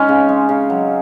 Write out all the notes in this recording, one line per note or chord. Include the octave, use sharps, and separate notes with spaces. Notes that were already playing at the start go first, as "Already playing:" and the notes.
Already playing: G#3 C#4 D#4
C#3
G#3
C#3
F#3